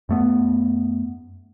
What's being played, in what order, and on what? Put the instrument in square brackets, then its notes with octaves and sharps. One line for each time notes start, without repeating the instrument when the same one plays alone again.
[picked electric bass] F#2 A3 B3